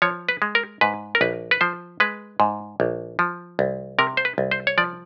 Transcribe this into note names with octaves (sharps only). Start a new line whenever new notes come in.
F3 C#5
B4
G#3
A#4
G#2 B4
A#4
A#1 B4
B4
F3 C5
G#3 B4
G#2
A#1
F3
C2
C3 A#4
C5
B4
C2
C5
C#5
F3 D5